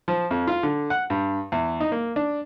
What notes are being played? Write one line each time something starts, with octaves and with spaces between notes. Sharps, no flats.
F3
F2
F4
D3
F#5
G2
E2
D#4
A#3
D4